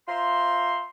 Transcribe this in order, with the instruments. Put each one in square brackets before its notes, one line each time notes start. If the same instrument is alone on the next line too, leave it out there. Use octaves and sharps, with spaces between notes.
[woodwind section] F4 C5 E5 A#5 C6